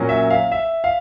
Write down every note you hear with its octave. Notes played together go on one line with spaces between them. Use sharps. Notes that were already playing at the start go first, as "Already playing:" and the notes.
Already playing: A#2 F#3 A#3 C#4
E5
F5
E5
F5